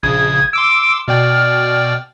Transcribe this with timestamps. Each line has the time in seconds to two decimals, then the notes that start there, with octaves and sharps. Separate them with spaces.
0.03 A#1 C#3 D#6 G#6
0.53 C6 D6 E6 D7
1.08 B2 D5 G5 F6